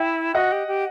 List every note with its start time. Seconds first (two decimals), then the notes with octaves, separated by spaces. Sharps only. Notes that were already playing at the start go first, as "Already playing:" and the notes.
Already playing: E4 E5 G5
0.35 F#4 D#5 F#5
0.52 G4
0.67 G4